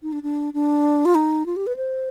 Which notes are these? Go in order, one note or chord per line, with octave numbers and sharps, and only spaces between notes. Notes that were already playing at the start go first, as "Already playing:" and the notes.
D#4
D4
D4
D4
F4
D#4
F4
G4
B4
C5